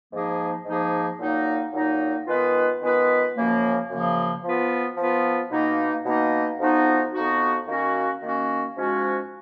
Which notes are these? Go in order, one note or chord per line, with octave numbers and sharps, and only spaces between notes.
G#2 F3 A#3 D#4 G#4
G#2 F3 A#3 D#4 G#4
A#2 F#3 A#3 D#4
A#2 F#3 A#3 D#4
D#3 G#3 B3 F4 B4
D#3 G#3 B3 F4 B4
F#2 C#3 F3 A#3
F#2 C#3 F3 A#3
F3 B3 F4 B4
F3 B3 F4 B4
B2 A#3 D#4
B2 A#3 D#4
F2 F3 B3 D#4 F#4
F2 F3 B3 D#4 F#4
D#3 A#3 C#4 F#4
D#3 A#3 C#4 F#4
G#2 F3 G#3 C#4 F#4